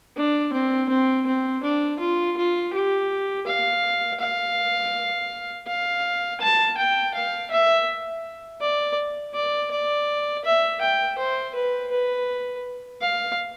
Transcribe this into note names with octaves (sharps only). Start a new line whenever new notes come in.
D4
C4
C4
C4
D4
F4
F4
G4
F5
F5
F5
A5
G5
F5
E5
D5
D5
D5
E5
G5
C5
B4
B4
F5